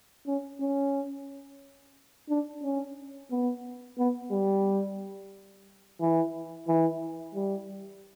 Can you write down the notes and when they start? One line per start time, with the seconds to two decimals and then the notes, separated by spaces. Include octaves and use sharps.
0.27 C#4
0.61 C#4
2.29 D4
2.63 C#4
3.31 B3
3.98 B3
4.32 G3
6.00 E3
6.68 E3
7.35 G3